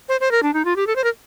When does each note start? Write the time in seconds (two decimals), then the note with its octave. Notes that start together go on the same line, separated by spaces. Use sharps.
0.09 C5
0.20 C5
0.31 A#4
0.43 D4
0.53 D#4
0.65 F4
0.76 G4
0.87 A4
0.96 C5
1.04 A#4